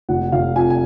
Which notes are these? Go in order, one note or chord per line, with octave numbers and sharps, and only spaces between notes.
F1 F#5
F1 F5
F2 G#5
G#5